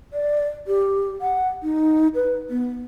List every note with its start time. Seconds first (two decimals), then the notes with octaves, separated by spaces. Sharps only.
0.13 D5
0.67 G4
1.21 F#5
1.63 D#4
2.15 B4
2.50 B3